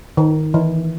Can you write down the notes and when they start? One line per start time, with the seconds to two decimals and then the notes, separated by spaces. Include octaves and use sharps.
0.17 D#3
0.54 E3